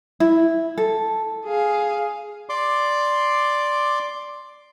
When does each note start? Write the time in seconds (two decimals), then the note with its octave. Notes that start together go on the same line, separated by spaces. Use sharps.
0.20 E4
0.78 A4
1.47 G#4 F5
2.49 D5 C6 D6